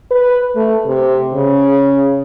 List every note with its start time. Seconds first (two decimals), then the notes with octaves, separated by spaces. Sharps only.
0.11 B4
0.56 A3
0.87 C3
1.34 C#3